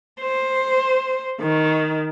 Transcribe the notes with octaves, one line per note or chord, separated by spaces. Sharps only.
C5
D#3